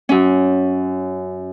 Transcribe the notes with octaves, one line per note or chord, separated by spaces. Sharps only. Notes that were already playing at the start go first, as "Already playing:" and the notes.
F#2 C#4